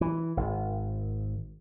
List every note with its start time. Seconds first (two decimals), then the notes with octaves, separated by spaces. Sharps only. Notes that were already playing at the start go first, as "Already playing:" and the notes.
0.01 E3
0.37 G#1